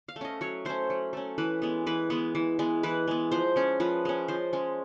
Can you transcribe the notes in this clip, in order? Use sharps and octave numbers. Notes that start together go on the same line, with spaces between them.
F5
A3
C#4 D#5
F#3 C#5
A3 C#4 C5
F#3
A3 C#4
E3 B4
G#3 B3
E3 B4
G#3 B3
E3
G#3 B3
E3 B4
G#3 B3
F3 C5
G#3 C#4
F3 B4
G#3 C#4
F3 C5
G#3 C#4